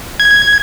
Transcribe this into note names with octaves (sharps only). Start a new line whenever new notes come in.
G#6